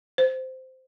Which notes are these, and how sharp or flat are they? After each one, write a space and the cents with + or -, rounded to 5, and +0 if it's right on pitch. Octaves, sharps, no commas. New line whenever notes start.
C5 -10